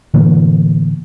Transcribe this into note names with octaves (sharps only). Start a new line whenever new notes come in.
A2 D3 E3 A#3